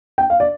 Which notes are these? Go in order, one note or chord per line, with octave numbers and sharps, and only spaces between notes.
G5
F5
D5